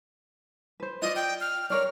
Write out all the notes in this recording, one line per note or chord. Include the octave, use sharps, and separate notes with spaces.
B4 C5
F4 D5 D#5
G5
F6
A#4 C#5 D5 F6